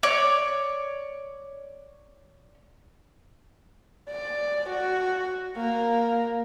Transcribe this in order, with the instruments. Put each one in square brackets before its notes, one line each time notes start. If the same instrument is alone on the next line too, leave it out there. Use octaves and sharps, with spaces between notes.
[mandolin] C#5 D5
[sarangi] D5
F#4
A#3